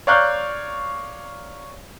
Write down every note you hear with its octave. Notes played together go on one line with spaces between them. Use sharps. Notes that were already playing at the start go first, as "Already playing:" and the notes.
C#5 D5 F5 A#5 F#6 G6